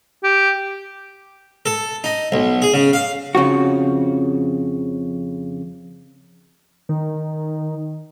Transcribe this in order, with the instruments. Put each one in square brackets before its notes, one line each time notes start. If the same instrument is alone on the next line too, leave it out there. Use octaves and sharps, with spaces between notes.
[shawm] G4
[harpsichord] A4
D#4
B1
G#4
C#3
F5
[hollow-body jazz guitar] F2 C#3 F3 F#4
[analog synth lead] D#3